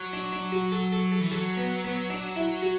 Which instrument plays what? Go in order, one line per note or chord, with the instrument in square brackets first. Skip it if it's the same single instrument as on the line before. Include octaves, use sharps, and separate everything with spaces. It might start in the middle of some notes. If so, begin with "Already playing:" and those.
Already playing: [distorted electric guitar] F#3
[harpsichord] D4
D4
F#4
A4
A4
A4
[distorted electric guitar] E3
[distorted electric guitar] F#3 [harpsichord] A4
[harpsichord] B3
B3
D4
E4
F#4